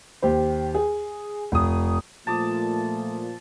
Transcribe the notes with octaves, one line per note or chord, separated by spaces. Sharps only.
D#2 G4 C5
G#4
F1 D#6
A#2 F3 A3 A5 D6 D#6